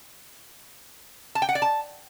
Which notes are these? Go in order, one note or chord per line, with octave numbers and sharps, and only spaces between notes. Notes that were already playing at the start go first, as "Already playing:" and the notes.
A5
G5
F#5
D5
A5